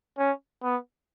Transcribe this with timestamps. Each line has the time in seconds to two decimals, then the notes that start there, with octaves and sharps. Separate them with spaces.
0.18 C#4
0.63 B3